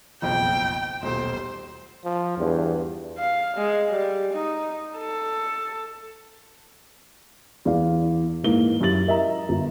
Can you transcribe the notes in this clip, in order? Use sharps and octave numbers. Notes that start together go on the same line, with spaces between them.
F#1 B1 F2 G5
D#1 B1 C5
F3
E2 G2
F5
G#3
G3
D#4
A4
E2 D5 F5
G#2 E3 A#3 G7
F#2 E4 G4 A6 F#7
A#4 D#5 E5 A#5
G1